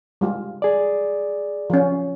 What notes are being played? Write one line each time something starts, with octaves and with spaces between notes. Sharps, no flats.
G3 G#3 F4
G#4 D5
F3 C#4